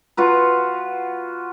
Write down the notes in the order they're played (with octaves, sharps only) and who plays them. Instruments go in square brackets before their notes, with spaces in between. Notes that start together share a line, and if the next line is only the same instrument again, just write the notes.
[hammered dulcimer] F4 F#4 B4